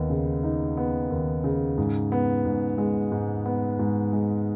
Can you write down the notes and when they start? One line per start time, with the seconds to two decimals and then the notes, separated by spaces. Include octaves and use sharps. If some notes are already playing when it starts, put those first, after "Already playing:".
Already playing: D#2 B3 D#4
0.10 C#3
0.43 D#4
0.77 B3
1.10 D#2
1.44 C#3
1.78 G#2
2.12 B3
2.45 G#2
2.78 G#3
3.12 G#2
3.46 B3
3.79 G#2
4.13 G#3